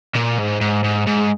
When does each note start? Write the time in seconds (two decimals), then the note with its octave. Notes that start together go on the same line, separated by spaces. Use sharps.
0.15 A#2
0.38 G#2
0.61 G#2
0.84 G#2
1.07 G#2